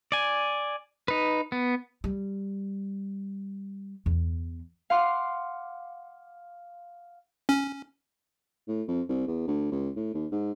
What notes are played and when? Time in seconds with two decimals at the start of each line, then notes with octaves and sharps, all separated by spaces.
0.12 D5 G#5
1.08 D#4 B4
1.52 B3
2.04 G3
4.06 E2
4.90 F5 F#5 C6 D6
7.49 C#4
8.68 A2
8.88 F2
9.09 C2
9.28 E2
9.48 D2
9.72 C#2
9.96 A2
10.14 D#2
10.32 G#2